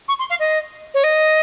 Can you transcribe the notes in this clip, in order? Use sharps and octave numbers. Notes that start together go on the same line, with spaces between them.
C#6
C6
F5
D#5
C#5
D#5